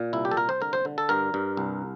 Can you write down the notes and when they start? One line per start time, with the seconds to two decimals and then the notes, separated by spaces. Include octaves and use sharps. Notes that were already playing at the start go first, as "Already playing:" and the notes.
Already playing: A#2
0.13 C2 E4
0.25 G4
0.31 A4
0.37 C2 A#4
0.49 C5
0.61 D3 A#4
0.73 C5
0.85 D3
0.98 A4
1.09 G2 A#4
1.34 G2
1.57 C2